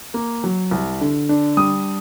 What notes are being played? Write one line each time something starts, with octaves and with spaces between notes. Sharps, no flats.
A#3
F#3
C2
D3
D4
G3 D#6